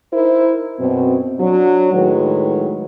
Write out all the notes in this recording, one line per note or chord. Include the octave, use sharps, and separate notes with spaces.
D#4 E4 A#4 C5
F#2 B2 C4
F#3 D4
A2 D#3 F#3 G#3 B4 C#5